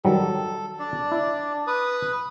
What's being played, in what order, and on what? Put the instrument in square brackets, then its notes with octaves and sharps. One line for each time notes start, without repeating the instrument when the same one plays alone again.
[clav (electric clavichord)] D#3 F#3 G3 [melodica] A4
[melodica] D4 D5
[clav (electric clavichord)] E4
[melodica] B4 D#6